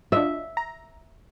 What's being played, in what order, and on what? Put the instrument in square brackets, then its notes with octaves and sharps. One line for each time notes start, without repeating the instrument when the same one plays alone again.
[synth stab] D4 F4 D#5 [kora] E5
[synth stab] A#5